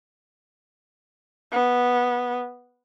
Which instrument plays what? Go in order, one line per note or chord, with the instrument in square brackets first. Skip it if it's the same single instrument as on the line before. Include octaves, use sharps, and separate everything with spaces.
[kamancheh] B3